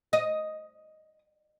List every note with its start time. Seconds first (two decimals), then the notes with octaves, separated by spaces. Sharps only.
0.13 D#5